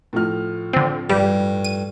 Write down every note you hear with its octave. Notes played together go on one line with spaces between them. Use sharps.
A2 F3 F6
D3 C4
G2 G3
D#7